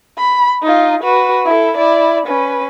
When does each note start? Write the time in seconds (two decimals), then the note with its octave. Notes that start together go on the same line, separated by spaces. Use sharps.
0.18 B5
0.63 D#4 F4
1.03 F#4 B4
1.46 E4 A4
1.78 E4 D5
2.27 C#4 B4